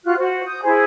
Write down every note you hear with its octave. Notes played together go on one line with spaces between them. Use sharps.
F4 F#4 F#6
F#4 C5
D#6 G6
E4 G#4 C5